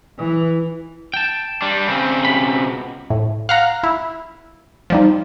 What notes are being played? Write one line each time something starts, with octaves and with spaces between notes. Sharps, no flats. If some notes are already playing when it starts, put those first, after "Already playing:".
E3
G5 A5
G3 D4
C#3 C4
C#2 B2 B5
A2
F5 F#5 A#5
E4
F3 G3 D#4